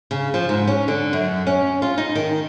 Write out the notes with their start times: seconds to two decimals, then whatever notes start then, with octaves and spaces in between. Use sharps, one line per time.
0.11 C#3
0.34 F3
0.49 G#2
0.67 C#4
0.88 D3
1.13 F#2
1.47 C#4
1.82 F4
1.98 D#4
2.15 D#3